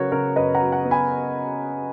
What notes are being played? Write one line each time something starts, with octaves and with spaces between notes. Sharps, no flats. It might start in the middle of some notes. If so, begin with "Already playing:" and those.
Already playing: C#3 F#3 B3 F#4 A#4 C#5
C#3 A#4 C#5
F#2 B4 D#5
F#5 A#5
F#3
F#5 A#5
B3
G#5 B5